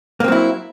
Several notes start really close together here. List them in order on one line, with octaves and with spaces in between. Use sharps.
A#3 C4 F#3 E4